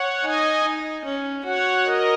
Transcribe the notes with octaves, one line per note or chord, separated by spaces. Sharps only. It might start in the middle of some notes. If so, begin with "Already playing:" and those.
Already playing: C#5 F#5
D#4 D#5 G#5
D#4
C#4
F#4 C#5 F#5
A#4 D#5